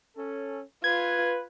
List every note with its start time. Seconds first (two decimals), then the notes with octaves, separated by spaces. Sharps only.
0.17 C#4 A4
0.84 F4 B4 G#6